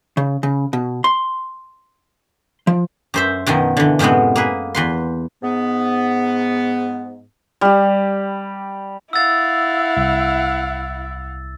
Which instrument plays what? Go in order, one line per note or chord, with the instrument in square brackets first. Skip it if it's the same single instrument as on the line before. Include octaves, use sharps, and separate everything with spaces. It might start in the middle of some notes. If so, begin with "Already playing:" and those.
[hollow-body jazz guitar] C#3
C#3
B2
C6
F3
[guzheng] F#2 C5 E5
F#2 B2 D#3 F3
D3 E3
F#2 A2 C3 G#3 B3
A#3 G#4 B4
E2 B4 C6
[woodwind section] G#2 B3
[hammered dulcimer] G3 G4
[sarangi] E4 [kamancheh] F5 F#5 [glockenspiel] E6 A6
[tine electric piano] C2